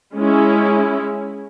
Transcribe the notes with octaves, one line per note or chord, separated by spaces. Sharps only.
G#3 C#4 E4